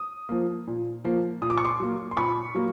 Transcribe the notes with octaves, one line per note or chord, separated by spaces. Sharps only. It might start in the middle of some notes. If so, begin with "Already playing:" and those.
Already playing: D#6
F3 A#3
A#2
F3 A#3
A#2 D#6
D6
C#6
C6 D6
F#3 A#3
C6
A#2 B5 C#6
F#3 A#3